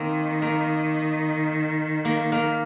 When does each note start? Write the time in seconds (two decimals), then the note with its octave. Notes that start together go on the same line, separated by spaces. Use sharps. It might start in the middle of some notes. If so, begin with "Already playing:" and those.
Already playing: D#3 A#3 C4
0.42 A#3
2.05 A#3
2.32 A#3